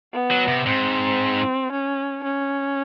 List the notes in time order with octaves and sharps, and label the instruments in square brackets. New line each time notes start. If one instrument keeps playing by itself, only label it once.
[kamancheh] B3
[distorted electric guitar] F#3
C3
[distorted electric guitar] G#2 [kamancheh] C4
[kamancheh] C#4
C#4